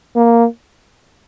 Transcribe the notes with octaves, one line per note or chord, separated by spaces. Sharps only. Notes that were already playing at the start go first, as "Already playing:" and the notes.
A#3